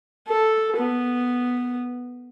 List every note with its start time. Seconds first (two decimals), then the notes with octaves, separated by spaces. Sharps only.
0.27 A4
0.76 B3